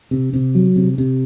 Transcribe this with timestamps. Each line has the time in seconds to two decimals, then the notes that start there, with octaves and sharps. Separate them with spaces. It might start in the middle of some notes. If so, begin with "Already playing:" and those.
0.11 C3
0.33 C3
0.55 F#3
0.76 C3
0.98 C3